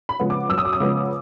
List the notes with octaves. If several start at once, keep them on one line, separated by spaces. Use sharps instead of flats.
B5
C#3 F3 G#3 B3
D6
F#2 E6
D#6
D6
D#6
C#3 F3 G#3 B3